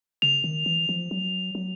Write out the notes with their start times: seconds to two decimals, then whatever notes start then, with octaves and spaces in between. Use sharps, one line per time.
0.22 C#3 F7
0.44 D#3
0.66 E3
0.89 F3
1.11 F#3
1.55 F#3